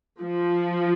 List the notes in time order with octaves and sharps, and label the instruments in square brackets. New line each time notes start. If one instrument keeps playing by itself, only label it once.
[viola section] F3